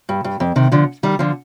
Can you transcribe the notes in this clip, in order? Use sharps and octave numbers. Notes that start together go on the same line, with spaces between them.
G2
G2
F2
C3 D#3
D3 F3
D#3 G3
D3 F3